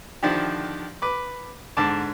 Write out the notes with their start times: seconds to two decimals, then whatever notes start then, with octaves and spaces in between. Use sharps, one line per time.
0.23 D3 D#3 F3 D4 E4 G4
1.02 B4 D6
1.77 G#2 D3 A5 D6